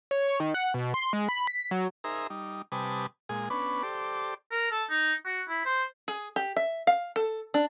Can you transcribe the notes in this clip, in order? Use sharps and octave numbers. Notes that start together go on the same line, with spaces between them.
C#5
D#3
F#5
B2
C6
G#3
B5
B6
F#3
D#4 G#4 A#4 C5 E5 A#5
G3 D#4
C3 G3 B4 G#5 A5 D#6
A#2 G#3 G#4
B3 C#4 D4 B4
G4 A4 C5 D5
A#4
A4
D#4
F#4
E4
C5
G#4
G4
E5
F5
A4
D4